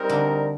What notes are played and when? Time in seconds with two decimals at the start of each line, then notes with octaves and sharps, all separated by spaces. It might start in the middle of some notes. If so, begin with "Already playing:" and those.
Already playing: G3 C4 D#4 A#4
0.10 D3